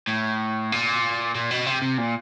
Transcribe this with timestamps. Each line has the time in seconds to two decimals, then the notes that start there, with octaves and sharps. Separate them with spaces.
0.08 A2
0.72 A#2
1.35 A#2
1.51 B2
1.66 C3
1.82 C3
1.98 A#2